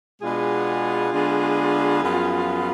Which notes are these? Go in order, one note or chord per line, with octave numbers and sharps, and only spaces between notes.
B2 G#3 B3 D4 F4 G#4
D3 G#3 B3 D4
F#2 F3 B3